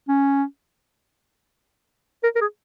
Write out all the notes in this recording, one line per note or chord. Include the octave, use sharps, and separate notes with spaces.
C#4
A#4
A#4
G#4